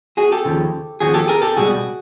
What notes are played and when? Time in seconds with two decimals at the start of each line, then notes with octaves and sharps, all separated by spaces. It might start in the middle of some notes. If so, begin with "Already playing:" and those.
0.17 F#4 G#4
0.32 G4 A4
0.45 D#2 C#3 F3
1.00 D#2 C#3 F3 F#4 G#4
1.14 G4 A4
1.28 G#4 A#4
1.42 G4 A4
1.56 C#2 B2 G3 F#4 G#4